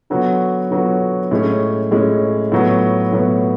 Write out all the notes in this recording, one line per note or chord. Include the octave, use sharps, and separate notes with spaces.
D3 F#3 B3 F#4
D3 F#3 B3 F#4
A2 G#3 C#4
A2 G#3 C#4
A2 F#3 B3
A2 F#3 B3